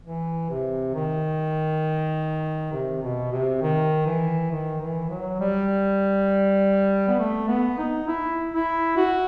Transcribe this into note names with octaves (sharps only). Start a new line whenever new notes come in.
E3
C3
D#3
C3
B2
C3
D#3
E3
D#3
E3
F#3
G3
B3
A3
B3
D#4
E4
E4
F#4